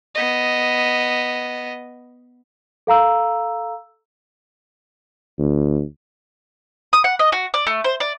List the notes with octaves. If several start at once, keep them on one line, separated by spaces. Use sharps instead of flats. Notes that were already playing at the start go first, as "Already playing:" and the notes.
B3 D#5
A4 F5 A#5 E6
D2
D#6
F#5
D#5
F#4
D5
A3
C5
D5